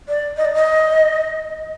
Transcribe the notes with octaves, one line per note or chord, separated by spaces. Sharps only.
D5
D#5
D5
D#5